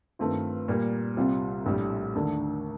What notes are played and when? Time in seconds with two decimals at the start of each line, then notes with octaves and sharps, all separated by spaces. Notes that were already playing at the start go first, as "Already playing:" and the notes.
0.19 G2 D#3 A3 C4 F4
0.68 A#2 G3 A#3
1.17 C2 C3 G3 C4 F4
1.66 A#1 A2 G3
2.15 D#2 D3 A3 D4